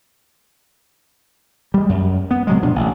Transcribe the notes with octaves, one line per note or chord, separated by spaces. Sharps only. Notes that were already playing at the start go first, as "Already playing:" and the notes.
G3 G#3
F#2
B3
C3 F#3 G#3
B2 F3 D4
A1